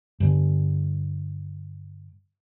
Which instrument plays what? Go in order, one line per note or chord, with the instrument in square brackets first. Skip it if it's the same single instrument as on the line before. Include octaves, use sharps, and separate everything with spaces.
[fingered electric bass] G2 D3